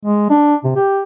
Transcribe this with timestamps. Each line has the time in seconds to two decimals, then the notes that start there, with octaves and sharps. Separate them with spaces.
0.05 G#3
0.30 D4
0.64 C3
0.76 G4